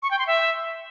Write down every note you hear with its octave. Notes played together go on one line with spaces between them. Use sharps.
C#6
G5
C6
E5